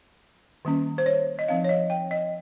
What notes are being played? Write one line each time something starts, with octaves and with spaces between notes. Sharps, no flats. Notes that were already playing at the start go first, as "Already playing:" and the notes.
D#3 G3 A#3 C#4
C5
C#5
D#5
F3 C4 D#4 F5
C#5
D#5
G5
D#5